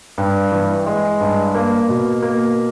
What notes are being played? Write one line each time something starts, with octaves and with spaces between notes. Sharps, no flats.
G2
E3
G#3
G2
A#3
B2
A#3